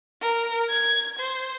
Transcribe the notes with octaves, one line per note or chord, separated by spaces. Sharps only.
A#4
G#6
C5